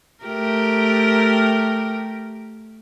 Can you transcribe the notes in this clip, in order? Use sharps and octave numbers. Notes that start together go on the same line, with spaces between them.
A3 G4 A#4